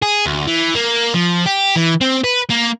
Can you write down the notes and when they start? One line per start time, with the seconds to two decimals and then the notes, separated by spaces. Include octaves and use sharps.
0.02 G#4
0.26 D2
0.47 E3
0.74 A#3
1.14 F3
1.46 G4
1.76 E3
2.01 C4
2.24 B4
2.50 A#3